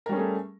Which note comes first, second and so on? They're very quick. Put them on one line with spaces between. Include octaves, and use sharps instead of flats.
A#4 G3 C#4 G#4 A3